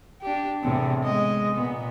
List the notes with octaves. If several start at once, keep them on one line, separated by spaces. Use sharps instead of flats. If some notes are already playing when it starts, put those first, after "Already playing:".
D4 G4
E2 A2 C3
G#3 D#5
A#2 B3